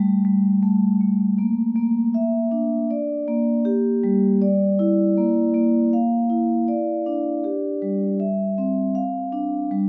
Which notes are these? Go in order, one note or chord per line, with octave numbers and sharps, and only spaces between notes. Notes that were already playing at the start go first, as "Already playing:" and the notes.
Already playing: G3 A3
G3
A3
A3
A#3
A#3
E5
D4
D5
A#3
G4
G3
D5
E4
A#3
A#3
F5
E4
D5
D4
G4
G3
E5
C4
F5
D4
G3